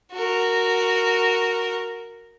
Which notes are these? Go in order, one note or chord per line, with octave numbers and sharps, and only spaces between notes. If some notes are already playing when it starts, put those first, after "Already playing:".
F#4 A#4